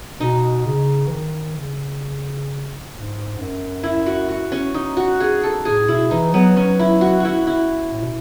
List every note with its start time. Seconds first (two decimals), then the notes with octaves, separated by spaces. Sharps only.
0.20 B2 D#4
0.66 C#3
1.06 E3
1.11 D#3
1.56 C#3
2.93 G#2
3.39 F#2
3.83 E4
4.06 F#4
4.29 F#4
4.52 C#4
4.74 D#4
4.97 F#4
5.20 G#4
5.43 A4
5.65 A2 G#4
5.88 B2 E4
6.11 E3 D#4
6.33 F#3 B3
6.56 F#3 C#4
6.79 E4
7.01 F#4
7.20 E4 F#4
7.47 E4
7.92 A2
8.01 B2